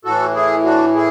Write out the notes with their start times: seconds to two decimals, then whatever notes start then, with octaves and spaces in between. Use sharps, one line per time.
0.05 A2 E3 F#4 A4
0.35 E4 G#4
0.64 D4 F#4
0.95 E4 G#4